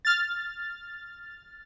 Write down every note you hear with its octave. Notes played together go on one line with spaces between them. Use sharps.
F6 A6